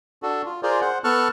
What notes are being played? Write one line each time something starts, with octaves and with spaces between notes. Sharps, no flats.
D4 F#4 A4
F4
F4 G#4 A#4 C5 D5
C5 F#5
B3 A4 A5 C#6 F6 F#6